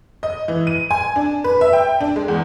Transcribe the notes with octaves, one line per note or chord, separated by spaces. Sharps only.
D#5
E3
D#7
G#5
D4
B4
E5
G5
D4
G#3
E2